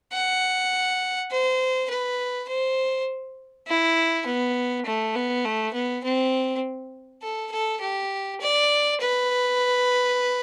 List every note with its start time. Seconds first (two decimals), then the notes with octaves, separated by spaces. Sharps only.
0.12 F#5
1.31 C5
1.90 B4
2.49 C5
3.67 E4
4.27 B3
4.86 A3
5.15 B3
5.45 A3
5.74 B3
6.04 C4
7.22 A4
7.52 A4
7.81 G4
8.41 D5
9.00 B4